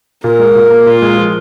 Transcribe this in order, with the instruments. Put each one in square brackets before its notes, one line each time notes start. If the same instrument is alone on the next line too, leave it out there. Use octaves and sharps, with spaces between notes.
[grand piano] A#2 [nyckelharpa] A#4
[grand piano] G#3
A#2
A#3
[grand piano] A#2 [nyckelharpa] F4
[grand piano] G#3
F3